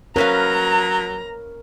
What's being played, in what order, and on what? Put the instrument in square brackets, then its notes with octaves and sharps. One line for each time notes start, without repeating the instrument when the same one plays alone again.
[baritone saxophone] F#3 [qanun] C#4 B4 F5 [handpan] A#4 [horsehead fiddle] A#5